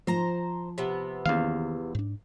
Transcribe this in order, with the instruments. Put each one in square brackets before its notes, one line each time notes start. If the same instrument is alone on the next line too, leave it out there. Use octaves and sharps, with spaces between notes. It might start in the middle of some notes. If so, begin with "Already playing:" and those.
[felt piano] F3 [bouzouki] C5 A#5
[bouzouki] C3 B3
[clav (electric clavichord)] E2 F5 [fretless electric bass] D#3 A#3 C#4
[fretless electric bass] G#2 D4